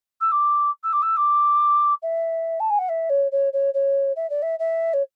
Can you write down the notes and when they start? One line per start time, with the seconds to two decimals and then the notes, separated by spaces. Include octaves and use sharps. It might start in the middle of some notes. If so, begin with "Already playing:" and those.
0.21 E6
0.32 D6
0.83 E6
0.93 D6
1.02 E6
1.17 D6
2.02 E5
2.60 A5
2.70 G#5
2.78 F#5
2.89 E5
3.09 C#5
3.32 C#5
3.53 C#5
3.74 C#5
4.16 E5
4.30 D5
4.42 E5
4.59 E5
4.93 C#5